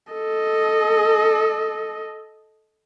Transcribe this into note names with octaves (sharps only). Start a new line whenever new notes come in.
A4 D#5